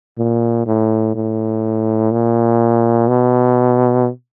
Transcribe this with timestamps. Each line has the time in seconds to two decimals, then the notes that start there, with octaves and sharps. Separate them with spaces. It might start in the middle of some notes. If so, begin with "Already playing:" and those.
0.18 A#2
0.66 A2
1.15 A2
2.12 A#2
3.08 B2